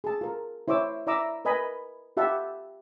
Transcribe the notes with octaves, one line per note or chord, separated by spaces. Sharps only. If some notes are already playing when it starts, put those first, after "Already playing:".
G#4 A5
F4 A#4
E4 C5 C#5 D6 E6
E4 D5 E5 A#5 D6 E6
A#4 B4 D#5 G#5 B5
F4 G4 E5 F#5 A5 B5